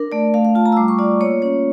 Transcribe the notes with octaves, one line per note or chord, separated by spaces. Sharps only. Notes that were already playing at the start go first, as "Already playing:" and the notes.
Already playing: D4 A#4
A3 D5
A3 F5
F5
F4 A5
A#5
E6
G3 D6
C#6
F4 D5
A#3 C#5
C#4 C#5